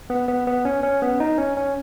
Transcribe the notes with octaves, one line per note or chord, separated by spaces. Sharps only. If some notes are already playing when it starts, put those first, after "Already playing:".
B3
B3
B3
C#4
C#4
B3
D#4
C#4
C#4